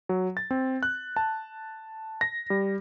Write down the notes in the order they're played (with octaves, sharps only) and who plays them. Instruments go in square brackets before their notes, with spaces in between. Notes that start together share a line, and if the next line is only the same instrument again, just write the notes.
[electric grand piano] F#3
A6
C4
F#6
A5
A#6
G3